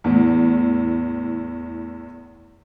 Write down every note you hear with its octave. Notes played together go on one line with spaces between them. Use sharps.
E2 A2